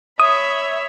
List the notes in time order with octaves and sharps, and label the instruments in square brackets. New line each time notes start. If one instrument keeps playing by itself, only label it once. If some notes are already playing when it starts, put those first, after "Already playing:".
[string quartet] C#5 E5 B5 [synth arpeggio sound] D#6